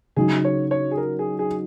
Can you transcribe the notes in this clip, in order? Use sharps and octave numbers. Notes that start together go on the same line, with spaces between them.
C#3 F#3 D#4 F#4 G#4
C#5
C#5
G#4
A#4
G#4
G#4